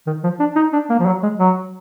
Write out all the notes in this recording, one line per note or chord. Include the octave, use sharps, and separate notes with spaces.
D#3
F3
D4
D#4
D4
A#3
F3
F#3
G#3
F#3